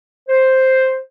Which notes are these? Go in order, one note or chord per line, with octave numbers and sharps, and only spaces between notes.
C5